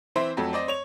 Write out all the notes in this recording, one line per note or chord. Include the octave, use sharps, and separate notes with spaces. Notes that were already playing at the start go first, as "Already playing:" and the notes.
E3 C4 C5 E5
F2 F#3 A3 A5
C4 D5 D#5
C#5 F7